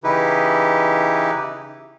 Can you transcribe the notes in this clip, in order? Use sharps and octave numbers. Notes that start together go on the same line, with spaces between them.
C#3 E3 D#4 E4 G4 B4